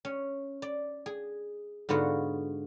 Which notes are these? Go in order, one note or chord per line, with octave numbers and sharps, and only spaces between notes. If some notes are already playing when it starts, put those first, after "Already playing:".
C#4
D5
G#4
G#2 D3 B3 F4 F#4